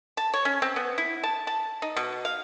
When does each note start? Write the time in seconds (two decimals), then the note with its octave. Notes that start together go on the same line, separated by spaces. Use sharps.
0.17 A5
0.34 C#5
0.45 C#4
0.62 C4
0.76 B3
0.98 E4
1.24 A5
1.47 A5
1.82 D#4
1.97 B2
2.25 F5